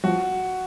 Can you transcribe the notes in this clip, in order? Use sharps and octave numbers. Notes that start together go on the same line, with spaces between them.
F3 F#4